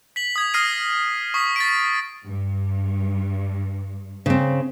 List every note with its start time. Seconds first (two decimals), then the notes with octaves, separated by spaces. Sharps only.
0.16 B6 F#7
0.36 D#6 G#6
0.54 D#6 F6 A#6 C7 D#7
1.34 C#6 D#6 B6
1.56 A6 B6 D7
2.25 G2
4.26 C#3 C4